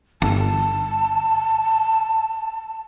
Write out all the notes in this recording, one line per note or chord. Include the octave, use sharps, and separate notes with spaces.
G1 A5